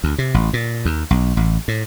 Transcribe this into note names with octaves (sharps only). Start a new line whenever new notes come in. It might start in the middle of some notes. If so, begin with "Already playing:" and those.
D2
C3
A1
A#2
D#2
B1
A1
A2